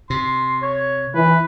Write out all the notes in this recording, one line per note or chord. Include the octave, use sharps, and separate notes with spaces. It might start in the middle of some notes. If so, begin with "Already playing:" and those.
C3 C6
C#5
E3 B4